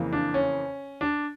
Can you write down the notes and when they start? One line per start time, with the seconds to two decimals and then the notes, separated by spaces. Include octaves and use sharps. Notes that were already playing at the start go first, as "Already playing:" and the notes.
Already playing: F2 C#3 E3 A#3
0.13 D4
0.34 C#4
1.01 D4